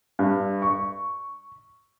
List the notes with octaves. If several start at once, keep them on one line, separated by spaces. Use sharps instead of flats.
G2
C#6